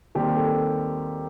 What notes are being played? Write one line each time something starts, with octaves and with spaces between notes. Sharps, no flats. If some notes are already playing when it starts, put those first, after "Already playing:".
D#2 D#3 G3 C4 G4
A4